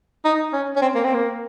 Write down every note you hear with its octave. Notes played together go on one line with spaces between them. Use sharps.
D#4
C#4
C#4
C4
A#3
C4
A#3